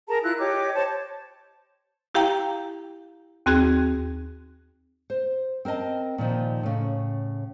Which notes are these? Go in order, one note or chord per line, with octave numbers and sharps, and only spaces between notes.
G#4 A#4 A5 A#5
E4 F4 F#6
G4 C#5 D#5 D6
C5 C#5 A5
E4 G4 F5 G5 A#5
D#2 C4 F#4 G#4 F#6
C5
C4 A#4 C#5 D#5 A5
A#2 D#3 F3 D#4
A2 C#3